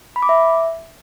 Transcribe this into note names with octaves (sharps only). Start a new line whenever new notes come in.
B5
D6
E5